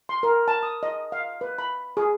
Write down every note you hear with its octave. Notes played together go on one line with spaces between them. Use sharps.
C6
A#4
A5
D#6
D#5
F5
B4
B5
G#4